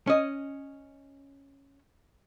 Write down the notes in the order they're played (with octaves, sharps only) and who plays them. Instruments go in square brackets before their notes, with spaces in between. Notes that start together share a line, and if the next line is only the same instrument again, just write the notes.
[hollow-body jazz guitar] C#4 D#5